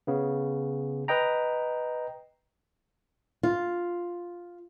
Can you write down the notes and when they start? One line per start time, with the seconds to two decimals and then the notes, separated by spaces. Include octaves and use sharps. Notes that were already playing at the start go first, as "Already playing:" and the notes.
0.07 C#3 B3
1.08 B4 D#5 G5 A#5
3.43 F4